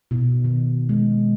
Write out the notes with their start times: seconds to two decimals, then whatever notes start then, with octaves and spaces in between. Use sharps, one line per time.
0.11 B2
0.44 D#3
0.89 G#3